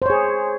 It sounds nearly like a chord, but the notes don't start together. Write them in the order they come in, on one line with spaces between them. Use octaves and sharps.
C5 C#5 G#4